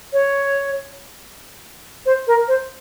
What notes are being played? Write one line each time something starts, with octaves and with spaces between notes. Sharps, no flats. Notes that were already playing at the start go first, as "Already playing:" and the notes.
C#5
C5
A#4
C5